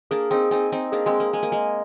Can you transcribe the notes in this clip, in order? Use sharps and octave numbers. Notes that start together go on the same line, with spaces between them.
A#3 D4 G#4
C4 D#4 G#4
C4 D#4 G#5
C4 D#4 D#5
A#3 D4 G#4
G#3 C4
G#4
A#3
G#3 G#5
A#3
G#3 D#5